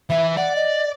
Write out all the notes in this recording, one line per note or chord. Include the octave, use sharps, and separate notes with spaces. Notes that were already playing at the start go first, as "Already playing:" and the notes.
E3 E4 E5
D5 F#5
D#5